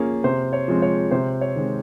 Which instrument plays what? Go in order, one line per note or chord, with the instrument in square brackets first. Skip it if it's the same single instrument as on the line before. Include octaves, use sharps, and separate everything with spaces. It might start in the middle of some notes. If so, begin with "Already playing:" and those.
Already playing: [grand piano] F3 A#3 C#4 G#4
C3 C5
C#5
F3 G#3 C4
C#5
C3 C5
C#5
D#3 G#3 C4